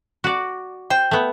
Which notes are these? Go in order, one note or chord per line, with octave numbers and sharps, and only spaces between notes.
F#4 D5
C5 G5
A3 B3